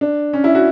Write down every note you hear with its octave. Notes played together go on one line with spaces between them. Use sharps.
D4
C#4
E4
F#4